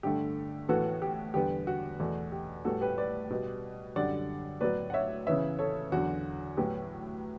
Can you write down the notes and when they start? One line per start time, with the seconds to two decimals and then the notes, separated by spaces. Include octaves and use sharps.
0.03 G2 D3 A3 G4
0.69 A2 E3 B3 F#4 A4
1.02 G4
1.34 E2 D3 G3 B3 G4
1.67 F#4
1.99 E2 B2 A3
2.32 G4
2.65 A2 G3 B3 F#4 A4
2.81 G4 B4
2.98 B4 D5
3.30 B2 G3 B3
3.96 F#2 D3 G3 D5 F#5
4.61 A2 F#3 B3 B4 D5
4.90 F#5
4.94 C#5 E5
5.27 C#3 E3 B3 C#5 E5
5.59 A4 C#5
5.92 E2 D3 F#3 F#4
6.57 A2 F#3 B3 G4